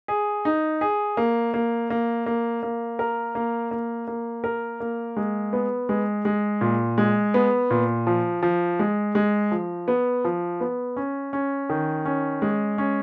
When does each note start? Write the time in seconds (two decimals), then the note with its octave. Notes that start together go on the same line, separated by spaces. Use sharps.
0.08 G#4
0.45 D#4
0.81 G#4
1.17 A#3
1.54 A#3
1.90 A#3
2.26 A#3
2.63 A#3
2.99 A#4
3.35 A#3
3.71 A#3
4.07 A#3
4.44 A#4
4.80 A#3
5.17 G#3
5.53 B3
5.89 G#3
6.25 G#3
6.61 A#2
6.98 G#3
7.34 B3
7.70 A#2
8.07 F3
8.43 F3
8.79 G#3
9.15 G#3
9.51 F3
9.88 B3
10.24 F3
10.61 B3
10.97 C#4
11.33 C#4
11.70 D#3
12.05 C#4
12.42 G#3
12.78 C#4